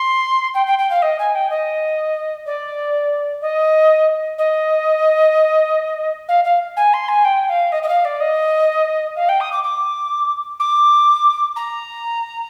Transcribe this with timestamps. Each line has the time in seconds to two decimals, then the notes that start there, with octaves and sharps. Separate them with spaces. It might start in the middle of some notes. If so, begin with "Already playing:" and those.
Already playing: C6
0.54 G5
0.66 G5
0.78 G5
0.90 F5
1.02 D#5
1.19 G#5
1.35 G5
1.50 D#5
2.46 D5
3.41 D#5
4.38 D#5
6.28 F5
6.44 F5
6.76 G#5
6.93 C6
7.08 G#5
7.24 G5
7.49 F5
7.72 D#5
7.83 D#5
7.88 F5
8.05 D5
8.20 D#5
9.16 F5
9.29 G5
9.40 D#6
9.52 D6
9.63 D6
10.59 D6
11.56 A#5